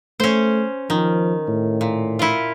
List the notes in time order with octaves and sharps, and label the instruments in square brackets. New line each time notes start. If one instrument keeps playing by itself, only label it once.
[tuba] A3 [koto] C#4 C5
[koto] D#3 [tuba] F3
[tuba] A2
[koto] A#2
E4 F4